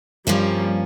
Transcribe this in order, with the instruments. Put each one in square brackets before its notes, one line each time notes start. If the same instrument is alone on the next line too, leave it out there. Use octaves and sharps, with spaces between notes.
[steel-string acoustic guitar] G2 F3 A#3 C#4 [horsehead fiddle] G3